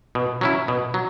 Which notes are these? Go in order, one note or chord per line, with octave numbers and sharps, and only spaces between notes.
B2
F#3 C#4 E4
B2
F#3